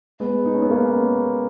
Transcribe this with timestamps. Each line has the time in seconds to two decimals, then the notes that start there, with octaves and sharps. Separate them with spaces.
0.20 G#3 B3
0.45 D#4
0.54 C#4
0.62 B3
0.70 A#3 C#4